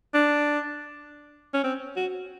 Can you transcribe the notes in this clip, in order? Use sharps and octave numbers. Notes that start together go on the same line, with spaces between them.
D4
C#4
C4
F#4